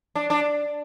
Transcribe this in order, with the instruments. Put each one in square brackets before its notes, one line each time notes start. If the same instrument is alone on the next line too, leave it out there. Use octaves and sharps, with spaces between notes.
[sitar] D4
D4